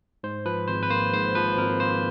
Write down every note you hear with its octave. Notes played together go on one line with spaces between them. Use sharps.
G#2 C5
F3 B4
G#1 C5
B4
A#3 C5
G#2 C5
F3 B4
G#1 A#4
A#3 C5